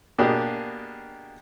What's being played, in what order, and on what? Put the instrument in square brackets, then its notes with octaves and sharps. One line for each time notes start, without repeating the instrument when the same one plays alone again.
[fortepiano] B2 A#3 D4 G4 G#4